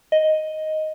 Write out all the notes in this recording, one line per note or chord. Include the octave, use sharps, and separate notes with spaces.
D#5